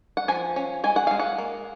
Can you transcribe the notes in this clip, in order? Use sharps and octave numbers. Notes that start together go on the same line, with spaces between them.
F#5
F3 G#5
C#4
G#3 G#5
F#5
G#3 F5
F#5
A#3